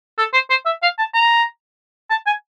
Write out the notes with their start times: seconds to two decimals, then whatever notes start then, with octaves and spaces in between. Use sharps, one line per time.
0.18 A4
0.34 C5
0.50 C5
0.66 E5
0.83 F5
0.98 A5
1.14 A#5
2.10 A5
2.26 G#5